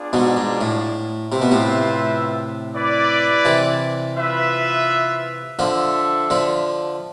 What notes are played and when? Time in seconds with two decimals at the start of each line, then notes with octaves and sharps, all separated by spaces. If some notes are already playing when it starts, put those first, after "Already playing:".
Already playing: B3 D4 F4 G#4 D5
0.13 G#2 B2
0.37 G#2
0.61 A2
1.32 C3 C4 F4 B4 E5
1.42 B2
1.51 A2 C3
2.74 E4 B4 D5
3.45 C3 E3
4.16 F4 B4 E5
5.59 D3 F3 D4 A4 E5
6.30 D3 F3